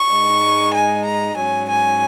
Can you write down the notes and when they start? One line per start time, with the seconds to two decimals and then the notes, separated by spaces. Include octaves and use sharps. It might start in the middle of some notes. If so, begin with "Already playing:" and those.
Already playing: C#6
0.10 G#2 G#3 D#4
0.74 G#5
1.06 A#5
1.37 G#2 F#3 C#4 G#5
1.69 G#5